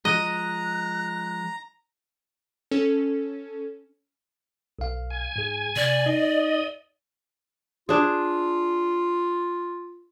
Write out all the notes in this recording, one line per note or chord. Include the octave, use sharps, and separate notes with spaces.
F3 G#3 D#5 A#5 F#6
C#4 A4
B1 F5
G#5
G#2 G#4
C3 D5
D#4 D#5
D4 F4 G#4